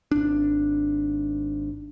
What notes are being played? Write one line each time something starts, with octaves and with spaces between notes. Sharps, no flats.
G#1 D4